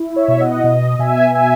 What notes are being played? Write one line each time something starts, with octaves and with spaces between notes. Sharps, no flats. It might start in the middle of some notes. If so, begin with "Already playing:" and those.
Already playing: E4
C#5 E5
B2
D#5 F#5
B2 D#5
B2 E5 G#5
E5 G#5